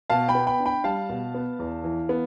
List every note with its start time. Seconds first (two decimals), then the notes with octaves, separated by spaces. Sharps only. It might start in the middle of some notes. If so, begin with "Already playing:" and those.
0.10 B2 F5 A5
0.29 G5 B5
0.35 B3
0.47 G5 B5
0.60 D4
0.65 G5 B5
0.84 G3 F5 A5
1.10 B2
1.35 B3
1.59 E2
1.84 E3
2.09 B3